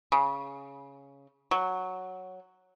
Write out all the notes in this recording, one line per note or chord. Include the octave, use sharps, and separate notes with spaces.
C#3
F#3